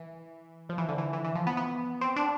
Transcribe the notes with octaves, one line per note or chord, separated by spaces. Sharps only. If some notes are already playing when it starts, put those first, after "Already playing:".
Already playing: E3
F3
E3
D3
E3
E3
E3
F3
B3
B3
C4
D4